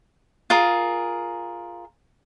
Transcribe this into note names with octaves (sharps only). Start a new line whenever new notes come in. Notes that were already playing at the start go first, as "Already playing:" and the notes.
F4 G#4 A#4